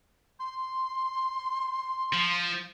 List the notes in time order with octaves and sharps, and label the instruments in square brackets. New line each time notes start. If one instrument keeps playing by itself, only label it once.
[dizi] C6
[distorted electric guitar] F3